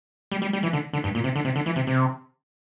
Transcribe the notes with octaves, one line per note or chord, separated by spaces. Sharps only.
G3
G3
G3
E3
D3
D3
G2
A#2
C3
D3
C3
D3
E3
C3
C3